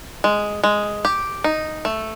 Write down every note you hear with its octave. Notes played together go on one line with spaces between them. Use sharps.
G#3
G#3
G4
D#4
A3